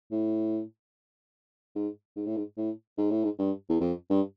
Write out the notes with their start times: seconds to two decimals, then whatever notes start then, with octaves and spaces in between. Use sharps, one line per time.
0.11 A2
1.75 G#2
2.16 G#2
2.27 A2
2.37 G#2
2.57 A2
2.98 G#2
3.11 A2
3.24 G#2
3.39 G2
3.70 E2
3.80 F2
4.10 G2